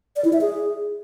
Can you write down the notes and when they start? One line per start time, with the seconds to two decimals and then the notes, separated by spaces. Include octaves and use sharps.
0.16 D5
0.25 E4
0.33 E5
0.41 G#4